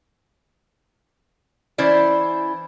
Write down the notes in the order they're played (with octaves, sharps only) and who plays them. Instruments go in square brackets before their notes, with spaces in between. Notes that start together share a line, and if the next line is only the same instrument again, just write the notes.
[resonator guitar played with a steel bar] E3 C#4 E4 C5 D5